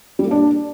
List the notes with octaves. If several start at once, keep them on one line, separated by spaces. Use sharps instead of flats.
G3
A#3
D4